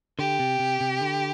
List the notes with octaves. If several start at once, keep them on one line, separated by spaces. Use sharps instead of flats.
D3 G4
C3
C3
C3
D3